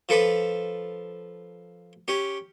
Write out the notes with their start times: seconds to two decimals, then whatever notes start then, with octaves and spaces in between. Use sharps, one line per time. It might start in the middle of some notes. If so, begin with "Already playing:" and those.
0.09 F3 A4 B4 D6
2.08 C#4 G4